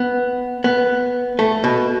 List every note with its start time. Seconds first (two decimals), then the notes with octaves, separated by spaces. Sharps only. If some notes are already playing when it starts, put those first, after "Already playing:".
Already playing: B3
0.64 B3
1.39 A3
1.64 B2